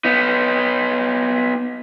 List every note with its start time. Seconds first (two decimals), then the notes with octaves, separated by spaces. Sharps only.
0.05 B3 D#4